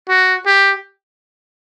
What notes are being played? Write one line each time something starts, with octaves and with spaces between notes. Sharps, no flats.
F#4
G4